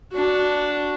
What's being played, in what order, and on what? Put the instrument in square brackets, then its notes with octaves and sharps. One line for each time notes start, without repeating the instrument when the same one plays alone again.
[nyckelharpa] D4 F#4